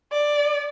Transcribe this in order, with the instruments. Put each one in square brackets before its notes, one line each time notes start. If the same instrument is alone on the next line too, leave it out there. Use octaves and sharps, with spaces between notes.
[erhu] D5